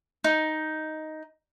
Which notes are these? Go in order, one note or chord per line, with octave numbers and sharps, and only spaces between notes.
D#4